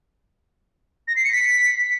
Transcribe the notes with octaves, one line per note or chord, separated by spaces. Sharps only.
A#6
C7
C#7
B6